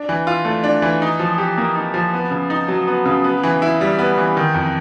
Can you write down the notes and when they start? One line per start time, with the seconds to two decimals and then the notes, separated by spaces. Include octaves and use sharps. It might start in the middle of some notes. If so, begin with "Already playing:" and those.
Already playing: D4
0.09 E3
0.27 F4
0.45 A3
0.63 D4
0.82 E3
1.02 D#4
1.19 F3
1.38 G4
1.58 A#3
1.76 D#4
1.94 F3
2.13 B3
2.31 C#3
2.50 D#4
2.68 F#3
2.87 B3
3.05 C#3
3.24 B3
3.43 E3
3.62 E4
3.81 G3
3.99 B3
4.18 E3
4.37 D#3
4.54 F2